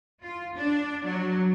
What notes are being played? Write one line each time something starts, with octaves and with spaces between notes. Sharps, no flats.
F4
D4
F#3